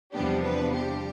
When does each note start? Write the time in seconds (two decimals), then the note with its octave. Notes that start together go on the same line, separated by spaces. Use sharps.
0.14 E2 C3 F3 G3 B3 D4 G4
0.44 B3 B4
0.73 G3 G4